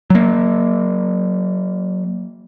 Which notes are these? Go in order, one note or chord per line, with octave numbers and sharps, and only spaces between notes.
F#3 A#3